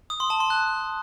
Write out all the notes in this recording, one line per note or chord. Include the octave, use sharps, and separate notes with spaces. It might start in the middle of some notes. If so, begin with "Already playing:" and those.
D#6
C6
A5
C6
F#6